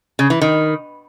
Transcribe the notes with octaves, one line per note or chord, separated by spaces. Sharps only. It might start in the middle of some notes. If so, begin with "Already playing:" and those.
C#3
E3
D#3